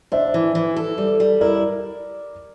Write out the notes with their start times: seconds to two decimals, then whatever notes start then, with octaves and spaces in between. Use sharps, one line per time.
0.12 D4 C5 E5
0.34 E3
0.55 E3
0.76 A4
0.98 G3
1.20 G3
1.41 E4 A#4 D5